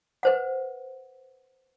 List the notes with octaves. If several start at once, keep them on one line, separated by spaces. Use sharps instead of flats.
B4 C5 F#5